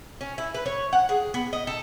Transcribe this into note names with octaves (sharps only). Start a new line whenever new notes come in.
C#4
E4
B4
C#5
F#5
G#4
B3
D#5
A4